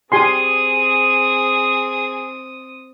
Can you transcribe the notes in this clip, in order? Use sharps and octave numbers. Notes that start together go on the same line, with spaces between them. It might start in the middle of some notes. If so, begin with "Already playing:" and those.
C4 G4 G#4 G#5 C6 D#6